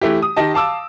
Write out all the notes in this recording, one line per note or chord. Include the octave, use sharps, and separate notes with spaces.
E3 A3 E4 G4
D#6
D#3 G4 D#5 A5
F5 A5 D6 E6